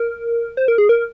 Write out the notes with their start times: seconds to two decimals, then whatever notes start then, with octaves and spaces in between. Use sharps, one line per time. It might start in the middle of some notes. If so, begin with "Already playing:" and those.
Already playing: A#4
0.57 C5
0.68 A#4
0.78 G#4
0.89 A#4